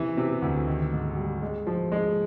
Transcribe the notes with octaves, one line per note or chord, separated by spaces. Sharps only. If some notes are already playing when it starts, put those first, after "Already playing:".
Already playing: C3 E3
C3
D2
D#3
G#2
G3
G#3
F3
G#3